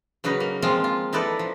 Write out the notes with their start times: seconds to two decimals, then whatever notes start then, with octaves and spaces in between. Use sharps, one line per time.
0.24 C#3 F#3 D#4 B4 D#5
0.40 A#3
0.62 F3 G#3 C4 F4
0.84 F4
1.13 D#4 E4 A4 B4 D5 D#5
1.39 F3